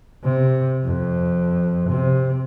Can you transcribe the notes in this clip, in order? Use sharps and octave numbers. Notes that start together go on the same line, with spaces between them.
C3
F2
C3